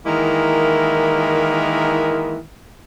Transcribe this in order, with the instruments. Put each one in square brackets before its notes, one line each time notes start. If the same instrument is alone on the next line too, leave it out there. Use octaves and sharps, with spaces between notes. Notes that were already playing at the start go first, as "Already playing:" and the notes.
[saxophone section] D#3 E3 G#3 A#3 E4 A#4